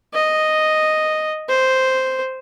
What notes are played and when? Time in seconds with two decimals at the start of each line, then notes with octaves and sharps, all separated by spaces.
0.14 D#5
1.49 C5